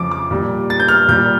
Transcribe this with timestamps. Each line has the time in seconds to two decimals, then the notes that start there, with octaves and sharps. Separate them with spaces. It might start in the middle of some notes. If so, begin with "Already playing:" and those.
Already playing: F2 C#3 F3 D6
0.11 D6
0.31 A#2 G3
0.70 A6
0.80 G6
0.88 F6
1.09 A#2 G3 G6